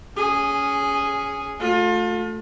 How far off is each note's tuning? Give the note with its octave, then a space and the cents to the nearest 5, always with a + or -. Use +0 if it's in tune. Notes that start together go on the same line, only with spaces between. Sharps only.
C#4 +15 G#4 -5
A3 +0 F4 +35